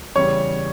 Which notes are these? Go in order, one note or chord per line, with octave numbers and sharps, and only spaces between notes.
E2 C#3 G3 C#5